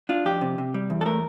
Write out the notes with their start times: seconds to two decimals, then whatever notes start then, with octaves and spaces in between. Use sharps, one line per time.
0.09 D4 F4
0.25 F2 G4
0.41 C3
0.58 C3
0.74 G3
0.90 E2
1.01 A4
1.05 A3 A#4